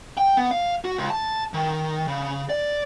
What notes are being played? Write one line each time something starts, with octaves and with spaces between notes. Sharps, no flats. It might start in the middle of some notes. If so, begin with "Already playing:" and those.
G5
B3
F5
F#4
C#2
A5
D#3
C#3
D5